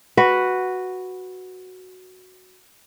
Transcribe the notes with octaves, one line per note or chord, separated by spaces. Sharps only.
F#4 B4